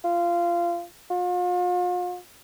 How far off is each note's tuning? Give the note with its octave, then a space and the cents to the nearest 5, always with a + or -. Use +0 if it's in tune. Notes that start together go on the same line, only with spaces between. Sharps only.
F4 -20
F4 +40